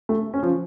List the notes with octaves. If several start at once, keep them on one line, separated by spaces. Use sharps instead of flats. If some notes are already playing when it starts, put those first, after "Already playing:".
A3
C#4
F3